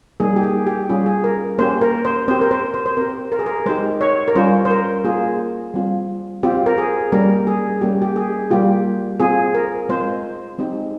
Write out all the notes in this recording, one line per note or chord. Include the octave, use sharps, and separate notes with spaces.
G3 A#3 D#4 G#4
G4
G#4
G4
G3 C#4 F4 G#4
G#4
A#4
A#3 C#4 G4 C5
A#4
C5
C4 G4 C5
A#4
C5
C5
C5
C4 G4 A#4
A#4
G#4
A#4
G#3 D#4 G4 C5
C#5
A#4
G3 C#4 F4 C5
C5
A#4
A#3 F4 G#4
G3 C4 F4
C4 F4 G4
A#4
G#4
G3 A#3 C#4 G4 A#4
G#4
G3 A#3 C#4 G4
G4
G#4
G3 A#3 F4 G4
C4 F4 G#4
A#4
G#3 C4 F4 C5
G#3 C4 D#4 G4